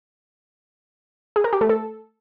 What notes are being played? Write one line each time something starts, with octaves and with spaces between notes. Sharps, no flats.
G#4
A#4
G4
A3
A4